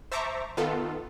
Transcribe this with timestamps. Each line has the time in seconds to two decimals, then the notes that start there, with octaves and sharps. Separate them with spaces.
0.12 C5 E5 A5 A#5 C#6 D6
0.57 D#3 B3 F4 A4